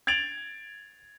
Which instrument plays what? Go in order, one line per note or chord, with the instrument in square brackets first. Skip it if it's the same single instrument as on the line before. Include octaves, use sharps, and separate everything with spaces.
[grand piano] G#6 A6 D7 F7 F#7